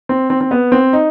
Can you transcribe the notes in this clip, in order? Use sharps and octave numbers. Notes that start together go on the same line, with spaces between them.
C4
C4
C4
B3
C4
D#4